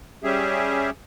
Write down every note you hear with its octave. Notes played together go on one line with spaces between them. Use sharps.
G3 C#4 G4 G#4 E5